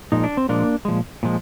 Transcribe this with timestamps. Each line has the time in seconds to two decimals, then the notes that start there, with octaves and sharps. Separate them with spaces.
0.12 A#2 F3 G#3 D#4
0.24 D4
0.37 C4
0.49 A#2 F3 G#3 A#3 D4
0.85 A#2 F3 G#3
1.23 A#2 F3 G#3